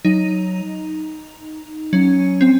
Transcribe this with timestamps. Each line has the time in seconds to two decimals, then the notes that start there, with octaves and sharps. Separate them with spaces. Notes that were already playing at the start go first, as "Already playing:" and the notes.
0.05 F#3 D#4
1.93 F#3 C#4
2.41 C4